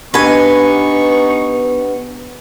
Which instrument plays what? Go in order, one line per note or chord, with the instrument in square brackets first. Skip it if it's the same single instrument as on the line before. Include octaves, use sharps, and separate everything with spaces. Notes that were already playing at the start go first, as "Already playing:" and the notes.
[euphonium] B3 [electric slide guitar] D4 G4 D#5 [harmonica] D#4 C#6 [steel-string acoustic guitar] B4 G#5